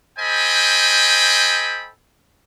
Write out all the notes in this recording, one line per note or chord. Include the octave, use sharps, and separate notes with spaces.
A4 C5 D#5 G5 G#5 B5